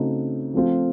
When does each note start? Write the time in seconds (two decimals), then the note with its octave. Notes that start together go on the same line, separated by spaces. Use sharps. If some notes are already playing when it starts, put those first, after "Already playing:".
Already playing: C#3 A3 C4 D#4 F#4
0.54 F3 A3 C4 F4